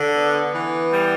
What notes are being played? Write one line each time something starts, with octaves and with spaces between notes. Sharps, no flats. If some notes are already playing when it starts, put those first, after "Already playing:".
Already playing: D3
B3
E3
G3